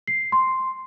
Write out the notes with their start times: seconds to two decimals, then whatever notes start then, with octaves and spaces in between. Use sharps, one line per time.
0.07 C7
0.32 C6